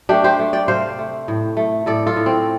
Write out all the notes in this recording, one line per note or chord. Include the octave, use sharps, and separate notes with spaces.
A3 D4 G4
G4 C5
A3
D5 G5
C3 C5 F5
A3
A2
A3
A2 A4 D5
F4 A4
A2
C4